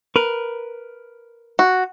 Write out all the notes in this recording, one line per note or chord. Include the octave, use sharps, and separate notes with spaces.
A#4 B4
F#4